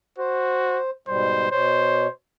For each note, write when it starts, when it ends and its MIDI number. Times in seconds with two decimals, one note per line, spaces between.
0.19 0.80 66
0.19 0.91 72
1.08 1.48 44
1.08 1.48 47
1.08 1.48 55
1.08 1.50 72
1.51 2.07 47
1.51 2.12 72
1.51 2.07 73